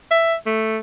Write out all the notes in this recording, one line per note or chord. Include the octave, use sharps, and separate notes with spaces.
E5
A3